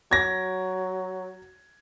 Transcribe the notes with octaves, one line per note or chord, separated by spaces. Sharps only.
F#3 G#6 A#6